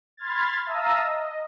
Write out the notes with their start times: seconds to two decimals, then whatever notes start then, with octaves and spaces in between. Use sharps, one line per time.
0.17 B5 C6 F6 G#6 A6
0.66 E5 F5 A5 A#5 D#6 E6
1.02 D#5